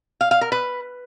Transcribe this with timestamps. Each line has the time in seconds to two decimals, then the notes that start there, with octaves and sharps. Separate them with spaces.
0.21 F5
0.31 F5
0.41 A#4
0.52 B4